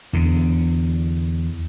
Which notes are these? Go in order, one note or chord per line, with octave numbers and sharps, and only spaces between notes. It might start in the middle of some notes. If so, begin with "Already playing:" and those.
E2 D3